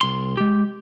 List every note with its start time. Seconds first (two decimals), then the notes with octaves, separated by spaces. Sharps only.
0.01 C2 C6
0.37 G#3 G4